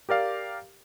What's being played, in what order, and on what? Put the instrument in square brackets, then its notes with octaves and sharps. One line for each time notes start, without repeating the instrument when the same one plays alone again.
[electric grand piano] G4 A#4 D5 F5